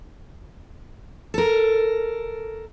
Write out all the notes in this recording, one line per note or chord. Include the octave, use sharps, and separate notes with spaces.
A4 A#4